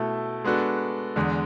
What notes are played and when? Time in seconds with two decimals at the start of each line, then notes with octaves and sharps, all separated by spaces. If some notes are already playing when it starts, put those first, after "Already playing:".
Already playing: B2 A3 E4 A4
0.44 G#3 B3 D4 F#4 A4
1.16 E2 D3 G#3